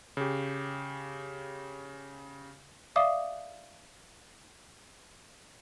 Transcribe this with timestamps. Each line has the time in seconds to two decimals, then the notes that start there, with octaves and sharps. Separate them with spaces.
0.17 C#3 G4
2.96 D5 E5 F5 D6 D#6